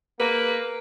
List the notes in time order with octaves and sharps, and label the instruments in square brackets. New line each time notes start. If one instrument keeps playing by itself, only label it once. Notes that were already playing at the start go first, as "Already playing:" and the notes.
[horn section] A#3 [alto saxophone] B4